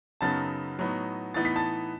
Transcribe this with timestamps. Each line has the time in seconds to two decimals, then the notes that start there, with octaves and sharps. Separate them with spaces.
0.21 F#2 C#3 F#3 B3 D#4 A5 A6
0.79 A2 F#3 B3 D#4
1.34 A2 E3 B3 D#4 A6
1.45 B6
1.56 A5 A6